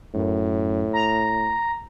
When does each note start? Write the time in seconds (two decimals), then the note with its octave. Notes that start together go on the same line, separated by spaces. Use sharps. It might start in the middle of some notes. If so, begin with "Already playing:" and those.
0.14 F#2 A2
0.93 A#5